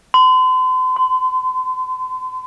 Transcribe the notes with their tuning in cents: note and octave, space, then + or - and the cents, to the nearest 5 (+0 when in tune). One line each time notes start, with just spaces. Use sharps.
C6 -40
C6 -25